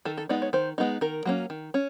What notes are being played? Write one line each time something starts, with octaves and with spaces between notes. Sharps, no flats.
D#3 A4
A4
G#3 B3 D#4 D5
C#5
D#3 C5
G#3 B3 D#4
D#3 A#4
F#3 A#3 C#4
D#3
C#4